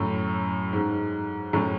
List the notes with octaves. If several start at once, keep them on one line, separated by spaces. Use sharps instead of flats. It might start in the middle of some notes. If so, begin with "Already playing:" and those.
Already playing: F#2 A2
G#2
F#2 A2